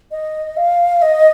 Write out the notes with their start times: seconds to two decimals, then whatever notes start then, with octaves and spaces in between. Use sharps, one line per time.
0.11 D#5
0.57 F5
1.02 D#5